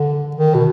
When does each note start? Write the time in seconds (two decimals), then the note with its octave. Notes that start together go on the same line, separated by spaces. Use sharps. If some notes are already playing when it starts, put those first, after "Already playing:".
Already playing: D3
0.36 D#3
0.54 B2